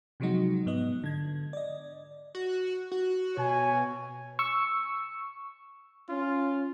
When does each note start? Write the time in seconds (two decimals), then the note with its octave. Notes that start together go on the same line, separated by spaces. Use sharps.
0.20 C3 F3 F#3 G#3 D#4 F#4
0.66 G#2 B3 D#5
1.04 D3 G#6
1.53 D5 D#5
2.35 F#4
2.91 F#4
3.37 B2 C#5 G#5
4.39 C#6 E6
6.09 C#4 F4